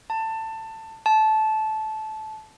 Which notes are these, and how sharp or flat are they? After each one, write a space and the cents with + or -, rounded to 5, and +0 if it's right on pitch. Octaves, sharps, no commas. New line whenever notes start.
A5 +20
A5 -15